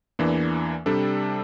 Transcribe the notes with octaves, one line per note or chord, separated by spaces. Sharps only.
E2 E3 A#3 D4
C3 G3 D4 A4